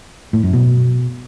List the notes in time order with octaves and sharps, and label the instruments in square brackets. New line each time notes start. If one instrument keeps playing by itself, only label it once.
[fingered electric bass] A2
F#2
B2